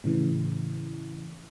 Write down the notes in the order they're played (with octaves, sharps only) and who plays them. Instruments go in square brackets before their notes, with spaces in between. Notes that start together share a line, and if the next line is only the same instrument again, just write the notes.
[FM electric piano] A2 C#3 E3